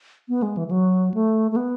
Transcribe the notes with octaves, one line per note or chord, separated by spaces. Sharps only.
B3
G#3
E3
E3
F#3
A3
A3
B3